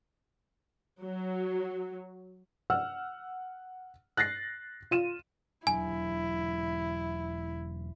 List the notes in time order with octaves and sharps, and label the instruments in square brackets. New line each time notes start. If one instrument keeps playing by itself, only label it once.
[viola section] F#3
[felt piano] F#5 E6 F6
F#6 A6 A#6 C7
F4 D#7 E7
[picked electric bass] E1 F#3 D4 [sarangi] E4 [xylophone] G#5